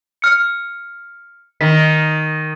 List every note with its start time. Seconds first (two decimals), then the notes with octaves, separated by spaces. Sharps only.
0.22 F6 C#7
1.61 D#3 B6